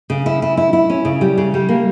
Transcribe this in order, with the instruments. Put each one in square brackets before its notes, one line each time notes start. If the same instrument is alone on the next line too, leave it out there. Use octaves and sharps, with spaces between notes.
[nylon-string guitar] C#3
E4
E4
E4
E4
C#4
C#3
G3
C#3
G3
A#3